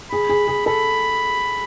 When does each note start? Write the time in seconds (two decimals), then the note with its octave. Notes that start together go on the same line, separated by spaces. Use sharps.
0.11 G#4 B5
0.29 G#4
0.48 G#4
0.66 A4 B5